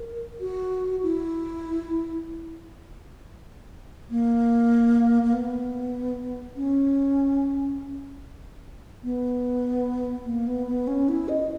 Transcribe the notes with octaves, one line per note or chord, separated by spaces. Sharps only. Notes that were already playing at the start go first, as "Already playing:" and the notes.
Already playing: A#4
F#4
E4
A#3
A#3
B3
C#4
B3
A#3
B3
B3
C#4
E4
D#5